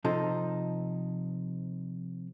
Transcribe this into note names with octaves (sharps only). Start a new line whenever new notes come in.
C3 F3 D#4 A4